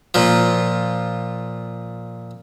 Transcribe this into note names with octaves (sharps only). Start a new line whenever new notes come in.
A#2 F3